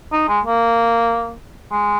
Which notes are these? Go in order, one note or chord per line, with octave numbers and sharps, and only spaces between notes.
D#4
G#3
A#3
G#3